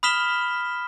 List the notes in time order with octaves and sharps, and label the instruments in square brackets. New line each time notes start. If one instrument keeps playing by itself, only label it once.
[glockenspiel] B5 D#6 F6 B6 E7 G7